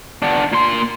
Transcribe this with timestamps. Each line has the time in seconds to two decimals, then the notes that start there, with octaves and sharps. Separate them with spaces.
0.22 B3 D4
0.52 A#2 C6